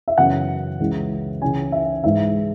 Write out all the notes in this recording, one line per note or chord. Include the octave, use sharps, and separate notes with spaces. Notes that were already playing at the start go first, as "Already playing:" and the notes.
E5
F#2 C#3 E3 B3 F#5
C#2 C#3 E3 G#3
C#2 C#3 E3 C#4 G#5
E5
G#2 E3 G#3 E5